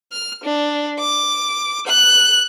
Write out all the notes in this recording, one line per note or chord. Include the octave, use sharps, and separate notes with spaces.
F6
D4
D6
F#6